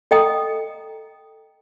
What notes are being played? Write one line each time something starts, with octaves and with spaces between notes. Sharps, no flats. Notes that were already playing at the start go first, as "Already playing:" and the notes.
A4 D#5 G5 A#5 D#6